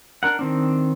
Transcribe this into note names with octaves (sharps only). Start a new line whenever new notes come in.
D4 A#4 F#5
D#3 C4 D4